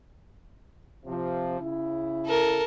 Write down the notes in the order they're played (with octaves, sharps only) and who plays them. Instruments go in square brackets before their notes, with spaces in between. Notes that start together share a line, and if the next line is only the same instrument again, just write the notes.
[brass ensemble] C3 F3
C#3 E4
[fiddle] A4 A#4